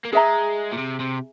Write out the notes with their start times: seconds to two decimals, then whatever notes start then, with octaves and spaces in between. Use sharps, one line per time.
0.05 A#3
0.12 G#3 G#4 E5 A#5
0.72 A#2
0.77 C3
1.00 C3